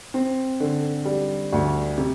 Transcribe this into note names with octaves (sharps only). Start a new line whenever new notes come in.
C4
D3
G3
D2
C3